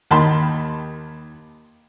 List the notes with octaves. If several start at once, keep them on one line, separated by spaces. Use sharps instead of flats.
D#2 D#3 A5 B5 C6